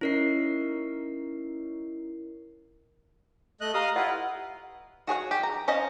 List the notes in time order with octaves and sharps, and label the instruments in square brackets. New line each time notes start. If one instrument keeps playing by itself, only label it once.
[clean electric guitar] C#4 D#4 [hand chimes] E4 A#4 C7
[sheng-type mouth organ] A3 D#5 F#6
[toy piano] G4 A#5 [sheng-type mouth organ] D#5 F5 D#6
[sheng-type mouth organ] E4 F4 B4 [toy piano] D#5 F#5
[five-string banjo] F#4 G#4 C#5 F#5
G4
A#5
C#4 C5 D#5 F5